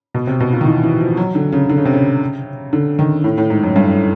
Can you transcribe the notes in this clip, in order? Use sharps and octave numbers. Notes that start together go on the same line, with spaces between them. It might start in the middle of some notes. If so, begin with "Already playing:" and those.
B2
C3
B2
A#2
D#3
E3
E3
F3
F#3
D3
C#3
D3
C#3
C3
C#3
D3
D#3
A2
A2
G#2
F#2
G2